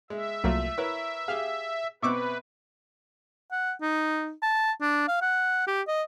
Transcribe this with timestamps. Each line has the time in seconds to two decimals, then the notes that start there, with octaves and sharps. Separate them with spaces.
0.10 G#3 E5
0.44 C2 F#3 A3 A#3 F4
0.78 E4 A#4 B4 C#5
1.28 G4 G#4 F5
2.02 B2 C4 B4 E5 C#6 D6 F#6
3.52 F#5
3.82 D#4
4.43 A5
4.81 D4
5.08 F5
5.22 F#5
5.67 G4
5.88 D#5